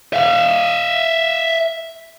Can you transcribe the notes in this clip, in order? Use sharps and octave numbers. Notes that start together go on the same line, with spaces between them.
E5 F5